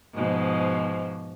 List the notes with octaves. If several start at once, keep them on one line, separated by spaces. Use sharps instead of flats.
G#2 B2 F3